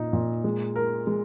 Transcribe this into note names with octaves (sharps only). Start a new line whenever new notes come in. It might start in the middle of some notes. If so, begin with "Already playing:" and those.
Already playing: A#2 D#4
A#2
G#3
A#4
G#3